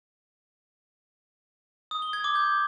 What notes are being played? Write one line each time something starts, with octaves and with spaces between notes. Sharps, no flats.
D#6
G7
G#6
D6
G6